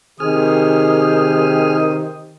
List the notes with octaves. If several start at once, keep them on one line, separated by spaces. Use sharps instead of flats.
C3 D#3 G4 G#4 C5 D#6 F6